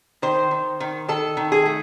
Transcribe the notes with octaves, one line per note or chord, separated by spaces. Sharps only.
D#3 C5
D#3
D#3
D#3 A4
D#3
G#4
A3